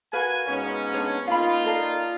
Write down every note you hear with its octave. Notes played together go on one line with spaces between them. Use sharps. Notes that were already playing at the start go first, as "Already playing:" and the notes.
F#4 A#4 B4 F5 G#5
G#2 B3 C#4
D4 C#5
A#3 D#4 F4 F5 B5
A4 D5 F5